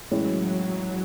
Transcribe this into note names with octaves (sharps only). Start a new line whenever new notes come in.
A2 E3 F#3 G#3 C#4